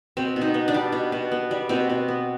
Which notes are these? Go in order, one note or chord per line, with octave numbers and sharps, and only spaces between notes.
B2 C4
B2
D#4
B3
D4
G3
B2
B2
B3
G3
B2 C4
B2
B3